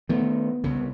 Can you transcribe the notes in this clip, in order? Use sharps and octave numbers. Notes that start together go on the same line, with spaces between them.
D#3 A3 B3
C2 C#3